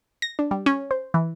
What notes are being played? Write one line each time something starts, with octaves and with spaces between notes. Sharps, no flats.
A#6
D4
G3
C#4
C5
E3